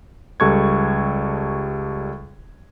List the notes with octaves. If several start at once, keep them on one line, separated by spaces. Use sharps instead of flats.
C#2 G3 A4 C#6 F#6 G#6